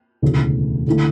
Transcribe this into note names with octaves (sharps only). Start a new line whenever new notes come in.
E1 D2 C#3 E3 A3
D3 A3 E4